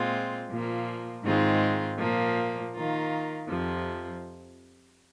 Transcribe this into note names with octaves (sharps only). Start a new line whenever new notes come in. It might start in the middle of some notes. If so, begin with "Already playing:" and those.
Already playing: A#2 G#3 C4 F4
A#2 F3 A#3
G#2 D#3 G#3 C4 F4
A#2 F3 A#3
D#3 A#3 F4
F2 C3 F3